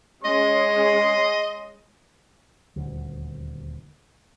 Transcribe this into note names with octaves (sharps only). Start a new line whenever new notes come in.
G#3 C#4 D#5 C6
D#1 D2